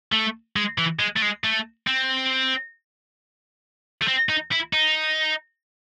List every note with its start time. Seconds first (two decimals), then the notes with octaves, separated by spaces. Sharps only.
0.12 A3
0.56 G#3
0.78 E3
1.00 G#3
1.17 A3
1.22 G#3
1.44 A3
1.87 C4
4.02 A3
4.08 C4
4.29 D#4
4.52 E4
4.73 D#4